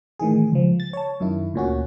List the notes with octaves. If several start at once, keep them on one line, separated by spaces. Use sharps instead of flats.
A2 D#3 E3 G#4
C#2 F3
A6
C#5 A5
F#2 D#3 E4
D2 A#2 C#4 F#4